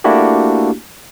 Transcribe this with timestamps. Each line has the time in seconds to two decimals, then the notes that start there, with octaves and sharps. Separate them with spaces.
0.04 A3 A#3 D4 E4 F#4 G4